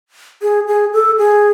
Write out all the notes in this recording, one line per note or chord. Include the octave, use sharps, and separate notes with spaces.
G#4
G#4
A4
G#4